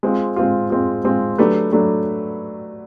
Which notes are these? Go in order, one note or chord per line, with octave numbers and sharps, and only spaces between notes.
G#3 C4 F4
G#3 C4 F4
G#3 C4 F4
G#3 C4 F4
F#3 A3 D4 G4 B4
F#3 A3 D4